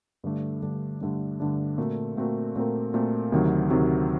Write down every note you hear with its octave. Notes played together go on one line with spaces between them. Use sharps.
G2 D3 A3 D4
G2 D3 A3 D4
G2 D3 A3 D4
G2 D3 A3 D4
A#2 A3 C4 F#4 A#4
A#2 A3 C4 F#4 A#4
A#2 A3 C4 F#4 A#4
A#2 A3 C4 F#4 A#4
D2 C3 D#3 F#3 C4
D2 C3 D#3 F#3 C4